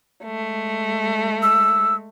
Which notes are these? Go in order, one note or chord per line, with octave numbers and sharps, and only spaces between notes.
G#3 A3
E6